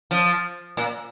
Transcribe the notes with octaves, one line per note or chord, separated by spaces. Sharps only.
F3
A#2